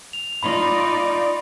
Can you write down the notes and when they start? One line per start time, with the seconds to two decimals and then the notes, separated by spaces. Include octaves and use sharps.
0.13 F7
0.43 D#4 F4 D5 B5 C6